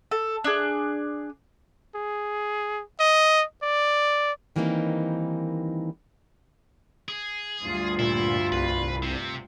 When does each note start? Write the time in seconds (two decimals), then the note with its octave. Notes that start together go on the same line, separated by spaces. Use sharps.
0.11 A4
0.44 D4 G#4
1.95 G#4
3.00 D#5
3.62 D5
4.56 D#3 E3 G3 A#3 C4 D#4
7.08 G#4
7.63 D2 G2 F4
7.99 A#2 E4
8.52 C2 B4
9.03 C3